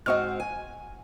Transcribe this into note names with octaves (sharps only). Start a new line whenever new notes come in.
G#2 C4 F#4 D#5 C#6 F6
G#5